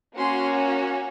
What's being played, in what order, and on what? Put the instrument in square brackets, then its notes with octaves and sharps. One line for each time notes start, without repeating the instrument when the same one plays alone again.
[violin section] A#3 C#4 F#4 C6